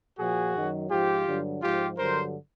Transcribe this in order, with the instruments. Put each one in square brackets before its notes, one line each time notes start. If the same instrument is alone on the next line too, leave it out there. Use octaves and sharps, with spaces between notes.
[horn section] A#2 F3 F#4 G#4
F#2 D#3 F#3
G#2 F3 F4 G4
G2 D3 F#3
G#2 F3 F4 G4
G2 D3 F#3 A#4 C5